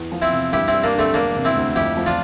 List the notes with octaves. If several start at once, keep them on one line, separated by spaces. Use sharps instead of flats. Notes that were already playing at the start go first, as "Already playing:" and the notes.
Already playing: E2
F3
C4 E4
C3
G2 E4 G4
G3 C4 E4
A#3 D4
D3 A3 C4
E1 A#3 D4
C3
C4 E4
D2
F2 E4 G4
F3
D4 F4